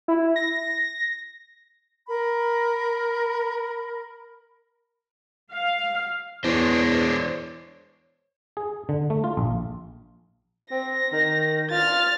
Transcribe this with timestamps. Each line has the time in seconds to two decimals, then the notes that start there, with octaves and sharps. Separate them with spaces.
0.08 E4
0.36 A#6
2.07 A#4 B5
5.53 F5
6.44 E2 G#3 D4 C5 C#5
8.57 G#4
8.89 D3
9.10 A3
9.24 F4
9.37 A#1
10.71 C4 A#6
11.13 D#3
11.71 F4 F6 A6